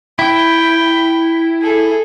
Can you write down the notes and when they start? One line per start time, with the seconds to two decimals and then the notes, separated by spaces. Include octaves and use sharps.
0.19 E4 G5
1.61 G#4 A4